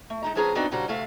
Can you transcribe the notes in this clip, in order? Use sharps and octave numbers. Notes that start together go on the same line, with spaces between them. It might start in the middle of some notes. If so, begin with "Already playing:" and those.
A3
G#3 D#4 A#5
F3 C4 C#4 G#4 B4 A#5
B3 C4 D4 D#4 F#4
A#2 C#3 G3 F#4 C5 A#5
D2 C3 A3 F5